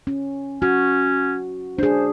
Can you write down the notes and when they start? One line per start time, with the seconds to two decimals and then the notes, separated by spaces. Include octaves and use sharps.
0.07 C#4
0.62 C#4 F#4
1.78 D4 G#4 C5